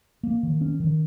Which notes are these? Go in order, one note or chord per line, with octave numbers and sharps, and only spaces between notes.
A#3
D#3
C#4
D#3